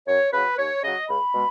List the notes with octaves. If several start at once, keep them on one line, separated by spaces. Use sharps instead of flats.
F#2 C#5
C#3 F#3 B4
D#2 C#5
C#3 F#3 D#5
C#2 B5
B2 G#3